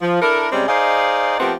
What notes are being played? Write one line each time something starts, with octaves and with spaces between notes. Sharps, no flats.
F3
D4 E4 A4 A#4
C3 G3 G#3 C4 C#4 D5
D#4 G#4 C5 D5 D#5 F5
F3 A3 B3 C4 G4 A#4